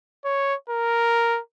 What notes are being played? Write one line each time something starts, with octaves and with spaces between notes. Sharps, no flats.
C#5
A#4